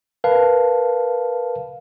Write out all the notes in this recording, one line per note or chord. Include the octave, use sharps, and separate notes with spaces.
A#4 B4 F5 A5